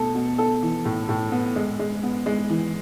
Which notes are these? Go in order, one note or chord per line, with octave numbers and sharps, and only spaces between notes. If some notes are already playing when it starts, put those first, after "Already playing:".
Already playing: B2 A3 A4
B2
A4
E3
A2
A2
B3
G#3
G#3
B3
G#3
E3